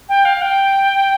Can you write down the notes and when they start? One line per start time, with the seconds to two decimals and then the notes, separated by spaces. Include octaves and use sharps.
0.09 G5
0.25 F5
0.41 G5